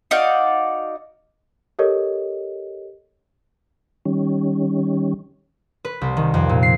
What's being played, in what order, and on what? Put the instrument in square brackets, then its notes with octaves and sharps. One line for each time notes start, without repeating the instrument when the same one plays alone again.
[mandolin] D#4 F#4 D5 F5
[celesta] G4 A4 A#4 C#5 D#5
[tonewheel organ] D#3 G3 C#4
[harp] B4
C2
D#3
F2
A#2
C7